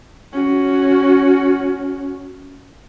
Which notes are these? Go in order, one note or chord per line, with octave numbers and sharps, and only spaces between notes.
C#4 F#4